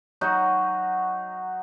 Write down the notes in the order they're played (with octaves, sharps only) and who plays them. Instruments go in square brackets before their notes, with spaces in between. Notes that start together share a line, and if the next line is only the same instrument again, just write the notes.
[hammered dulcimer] F#3 D#4 F#4